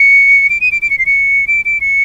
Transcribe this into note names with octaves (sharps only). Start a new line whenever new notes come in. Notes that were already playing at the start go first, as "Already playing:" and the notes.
Already playing: C#7
D7
D#7
D7
D7
C#7
C7
C#7
D7
D7
C#7